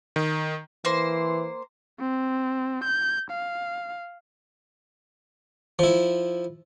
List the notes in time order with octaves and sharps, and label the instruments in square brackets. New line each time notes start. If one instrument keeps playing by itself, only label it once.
[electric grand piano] D#3
[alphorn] E3 [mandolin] A#3 C5
[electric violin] C4
G6
F5
[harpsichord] F3 E4